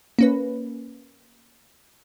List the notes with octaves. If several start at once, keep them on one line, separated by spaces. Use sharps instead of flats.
A#3 C#4 B4